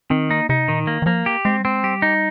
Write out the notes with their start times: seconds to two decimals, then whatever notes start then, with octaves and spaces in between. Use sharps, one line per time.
0.10 D#3 C4
0.30 A#3 D#4
0.49 C3 D#4
0.68 A#2 D#3
0.87 A#3
1.02 D#3
1.06 F3 A#3
1.26 G4
1.45 G#3 C4
1.60 G3
1.64 G#3 C4
1.83 G3 G4
2.02 D#4